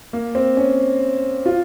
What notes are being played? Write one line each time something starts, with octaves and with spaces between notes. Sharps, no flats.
A#3
C4
C#4
F4